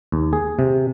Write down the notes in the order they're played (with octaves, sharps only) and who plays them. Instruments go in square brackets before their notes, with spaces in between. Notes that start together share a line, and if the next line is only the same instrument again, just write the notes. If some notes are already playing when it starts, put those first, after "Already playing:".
[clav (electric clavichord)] D#2
G#4
C3